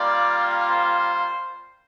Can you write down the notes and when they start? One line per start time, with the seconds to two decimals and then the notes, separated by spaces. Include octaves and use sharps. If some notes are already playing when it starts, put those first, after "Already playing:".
Already playing: G3 A#3 F4 D5
0.69 C5